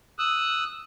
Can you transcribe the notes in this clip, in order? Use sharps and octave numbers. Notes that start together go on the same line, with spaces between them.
D#6 E6 F#6